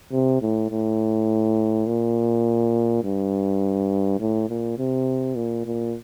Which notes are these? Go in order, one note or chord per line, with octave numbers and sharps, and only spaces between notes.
C3
A2
A2
A#2
G2
A2
A#2
C3
A#2
A#2